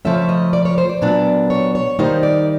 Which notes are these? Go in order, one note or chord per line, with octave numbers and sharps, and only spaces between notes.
C#3 F3 A3 C#4 E5
D#5
D5
C#5
C5
D5
A#2 F#3 B3 D4
C#5
C#5
D#3 G3 A#3 D#4 C5
D5